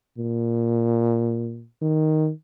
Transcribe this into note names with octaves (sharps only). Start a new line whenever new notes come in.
A#2
D#3